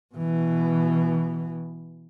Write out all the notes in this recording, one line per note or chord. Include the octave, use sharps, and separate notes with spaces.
B2 E3